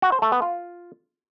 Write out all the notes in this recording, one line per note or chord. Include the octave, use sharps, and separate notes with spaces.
F#4
C5
A3
B3
F4